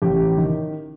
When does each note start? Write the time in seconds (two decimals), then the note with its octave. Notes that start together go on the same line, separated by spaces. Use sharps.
0.02 A1 G4
0.37 D#3